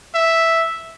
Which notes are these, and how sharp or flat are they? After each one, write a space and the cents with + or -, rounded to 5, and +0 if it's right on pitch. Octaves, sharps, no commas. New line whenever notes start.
E5 +0